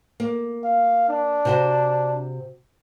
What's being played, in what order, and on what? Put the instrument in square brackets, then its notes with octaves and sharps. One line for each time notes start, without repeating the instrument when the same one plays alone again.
[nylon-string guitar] A#3
[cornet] F5
D4
[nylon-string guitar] C3 F#4 C5